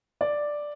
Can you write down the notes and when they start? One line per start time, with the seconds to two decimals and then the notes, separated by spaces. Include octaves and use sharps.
0.21 D5